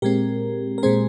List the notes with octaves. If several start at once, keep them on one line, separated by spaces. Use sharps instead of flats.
A#2 G#3 C4 G4 A#4
A#4
A#2 G#3 C4 G#4 C5